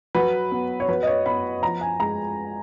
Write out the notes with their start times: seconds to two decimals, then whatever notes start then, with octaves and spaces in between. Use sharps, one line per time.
0.15 F#3 B4
0.52 B3
0.80 C#5
0.88 F#3 B4
1.03 D#5
1.07 C#5
1.26 B3 B5
1.62 F3 A#5
1.81 G#5
2.00 G#3 A#5